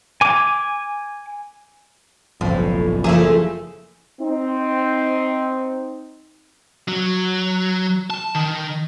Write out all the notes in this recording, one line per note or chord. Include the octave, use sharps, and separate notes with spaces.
G#5 D6
F#1 B1 F#2 A2 F3
F#1 F3 A3 A#3 E4 G#4
C4 D#4
F#3
A5
D#3